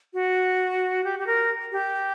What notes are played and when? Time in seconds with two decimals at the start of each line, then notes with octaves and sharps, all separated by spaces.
0.14 F#4
1.04 G4
1.19 G4
1.27 A#4
1.72 G4